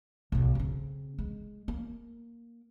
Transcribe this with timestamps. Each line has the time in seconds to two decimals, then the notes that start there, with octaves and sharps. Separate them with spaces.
0.32 B1 G#2
0.55 C#3 C4
1.19 G#3
1.68 A#3